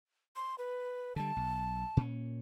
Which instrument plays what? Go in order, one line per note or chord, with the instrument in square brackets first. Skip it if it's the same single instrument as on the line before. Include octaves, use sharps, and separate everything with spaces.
[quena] C6
B4
[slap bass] D3 G3 [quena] A5
[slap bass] B1
A#2 C#4